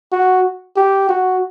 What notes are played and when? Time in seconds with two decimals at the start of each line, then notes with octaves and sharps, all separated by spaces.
0.12 F#4
0.76 G4
1.09 F#4